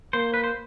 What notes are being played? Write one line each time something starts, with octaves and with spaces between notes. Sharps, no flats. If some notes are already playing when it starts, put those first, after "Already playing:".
A#3 C5
B4
C5